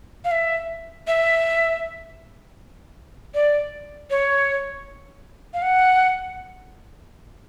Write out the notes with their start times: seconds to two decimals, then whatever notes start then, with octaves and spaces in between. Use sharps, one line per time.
0.25 F5
0.31 E5
1.07 E5
3.34 D5
4.10 C#5
5.54 F5
5.62 F#5